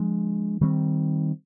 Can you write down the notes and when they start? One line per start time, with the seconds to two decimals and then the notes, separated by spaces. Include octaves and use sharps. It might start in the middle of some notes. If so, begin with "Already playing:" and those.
Already playing: F3 G#3 D4
0.61 D#3 G3 C4